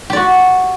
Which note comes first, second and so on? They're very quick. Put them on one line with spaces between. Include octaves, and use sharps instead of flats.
G4 D5 F#4